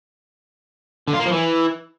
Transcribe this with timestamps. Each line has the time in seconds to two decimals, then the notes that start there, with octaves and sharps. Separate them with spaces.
1.08 D3
1.14 F4
1.20 A#3
1.26 F3
1.32 E3